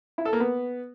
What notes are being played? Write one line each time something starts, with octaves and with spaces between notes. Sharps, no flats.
E4
A4
A#3
B3